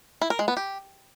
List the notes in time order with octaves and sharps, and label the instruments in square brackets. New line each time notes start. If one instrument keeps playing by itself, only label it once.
[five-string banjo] E4
A#4
G#3
B3
G4